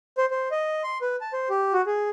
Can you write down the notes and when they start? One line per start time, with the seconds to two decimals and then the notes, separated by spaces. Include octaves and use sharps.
0.18 C5
0.31 C5
0.51 D#5
0.84 C6
1.02 B4
1.21 A5
1.33 C5
1.50 G4
1.73 F#4
1.86 G#4